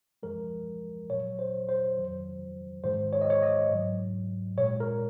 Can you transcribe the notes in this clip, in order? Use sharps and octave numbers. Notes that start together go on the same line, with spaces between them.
F#2 F3 G#3 A#4
A#2 F#3 C#5
C5
C5
F2 D#3 F#3
G#2 D#3 G#3 C5
C#5
D#5
C#5
D#5
G#2 F#3
A#2 G#3 C#5
A#4